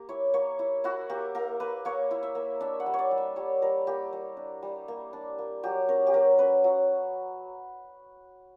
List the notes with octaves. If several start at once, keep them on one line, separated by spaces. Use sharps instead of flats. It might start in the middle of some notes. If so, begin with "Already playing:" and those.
Already playing: A#3 G4
E4 C#5
A#3 C#5
E4
E4 F#4
A#3 G4
A#3 A#4
A#3 B4
A#3 C#5
E4
E5
A#3
D4 E5
F#5
G3
C#5
D5
G3
E5
G3 C#5
G3 A#4
A#3 G4
G3
D4
G3
A#3
D4
A#3
F#3 G4
C#4 A#4
G4
F#3 A#4
C#4 B4
F#3